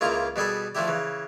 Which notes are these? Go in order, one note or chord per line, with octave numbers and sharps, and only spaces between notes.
C#2 C#3 A#3 E4 F4 A#5
B2 G3 G#4 A4 B5
F3 A3 D4 E4 G4
C#3 E3